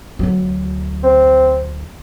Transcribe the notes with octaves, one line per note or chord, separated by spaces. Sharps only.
D2 F#3
C4